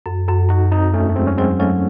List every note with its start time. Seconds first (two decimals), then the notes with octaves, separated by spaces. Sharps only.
0.06 F#2 F#4 A4
0.28 F#2 F#4 A4
0.49 F#2 D#4 F#4
0.71 F#2 C4 D#4
0.94 E2 A3 C#4
1.09 A3
1.16 F#3 G#3 C4
1.27 C#4
1.38 F#3 G#3 C4
1.60 F#3 A3 C#4